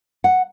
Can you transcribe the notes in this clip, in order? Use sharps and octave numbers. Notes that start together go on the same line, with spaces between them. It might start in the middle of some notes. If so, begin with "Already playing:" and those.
F#5